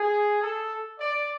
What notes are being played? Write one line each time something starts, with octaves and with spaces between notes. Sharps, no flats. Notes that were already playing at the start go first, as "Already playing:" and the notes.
Already playing: G#4
A4
D5